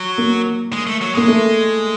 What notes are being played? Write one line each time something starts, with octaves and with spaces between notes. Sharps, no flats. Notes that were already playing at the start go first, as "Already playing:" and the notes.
Already playing: F#3
A#3
G#3
A3
F#3
G#3 A#3
A3